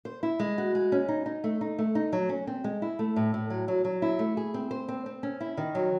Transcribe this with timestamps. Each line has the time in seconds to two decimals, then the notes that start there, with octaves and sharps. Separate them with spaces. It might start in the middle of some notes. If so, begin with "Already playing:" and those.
0.05 C5
0.23 E4
0.40 G#3
0.58 F#4
0.75 G#3
0.92 C#4
1.09 D#4
1.26 D#4
1.44 A3
1.61 D#4
1.79 A3
1.95 D#4
2.13 F#3
2.29 C#4
2.47 C4
2.64 G#3
2.82 E4
2.99 A3
3.16 A2
3.34 A2
3.50 F#3
3.68 F#3
3.85 F#3
4.02 E4
4.19 A3
4.37 G#4
4.54 C4
4.71 C5
4.88 C4
5.06 C4
5.23 C#4
5.40 E4
5.57 D#3
5.75 F#3